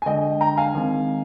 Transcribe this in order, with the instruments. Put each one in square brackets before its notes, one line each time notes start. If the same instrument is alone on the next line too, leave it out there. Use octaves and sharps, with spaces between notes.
[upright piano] G#5
[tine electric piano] D3 G#3 D4 [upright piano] D#5 G5
[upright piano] G5 A#5
F5 G#5
[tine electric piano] D#3 G#3 C4